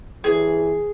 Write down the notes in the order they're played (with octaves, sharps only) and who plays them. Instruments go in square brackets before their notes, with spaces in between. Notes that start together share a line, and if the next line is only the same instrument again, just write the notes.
[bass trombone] E3 [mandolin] G#4